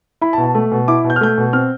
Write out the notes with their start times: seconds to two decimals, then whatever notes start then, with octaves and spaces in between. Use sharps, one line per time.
0.21 E4 B5
0.33 A5
0.38 B2
0.44 A5
0.55 A3
0.72 B2
0.88 E4 D6
1.04 B2
1.10 G6
1.16 F6
1.21 A3 G6
1.38 B2
1.53 C4 F6